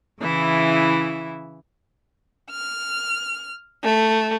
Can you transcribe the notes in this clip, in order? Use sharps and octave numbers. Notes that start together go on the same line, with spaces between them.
C#3 E3 E4
F6
A3